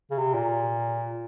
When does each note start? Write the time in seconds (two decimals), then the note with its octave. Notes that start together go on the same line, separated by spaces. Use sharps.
0.11 C#3
0.18 C3
0.34 A#2